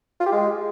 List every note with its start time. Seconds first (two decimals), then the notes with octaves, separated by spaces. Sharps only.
0.20 F4
0.26 G4
0.32 G#3